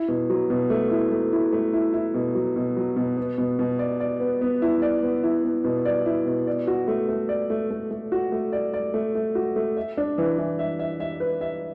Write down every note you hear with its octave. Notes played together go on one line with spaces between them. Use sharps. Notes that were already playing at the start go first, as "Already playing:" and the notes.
Already playing: E4
B2
F#3
B2
A3
E4
A3
E4
A3
E4
E4
B2
F#3
B2
F#3
B2
B3
B2
B2
D5
D5
B3
B3
E4
D5
B3
E4
B3
B2
D5
E4
B2
D5
F#4
A3
A3
D5
A3
A3
A3
F#4
A3
D5
D5
A3
A3
F#4
A3
E5
D4
E3
E3
E5
E5
E5
B4
E5